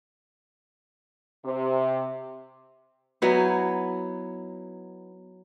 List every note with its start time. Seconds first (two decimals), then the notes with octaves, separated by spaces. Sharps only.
1.44 C3
3.22 F#3 B3 D#4 E4